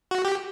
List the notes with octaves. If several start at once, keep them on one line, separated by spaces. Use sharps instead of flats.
F#4
G4